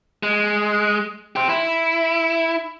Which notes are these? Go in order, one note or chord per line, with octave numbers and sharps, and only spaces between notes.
G#3
G4 C5
E4